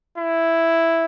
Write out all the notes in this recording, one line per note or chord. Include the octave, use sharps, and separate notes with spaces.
E4